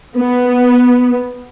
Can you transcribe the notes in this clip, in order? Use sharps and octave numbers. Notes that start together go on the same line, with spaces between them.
B3